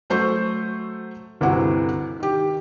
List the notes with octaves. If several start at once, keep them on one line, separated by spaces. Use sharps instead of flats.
F#3 A3 C5 C#6 G6
G1 D2 C3 E3 E4 F#4
D#3 G4